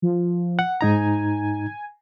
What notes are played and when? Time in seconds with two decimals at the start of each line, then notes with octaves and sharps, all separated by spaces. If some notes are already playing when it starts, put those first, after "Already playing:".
0.02 F3
0.59 F#5
0.81 G#2 D#4 G#5 A#5